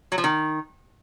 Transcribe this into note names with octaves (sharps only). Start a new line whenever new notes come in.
F#3
F3
D#3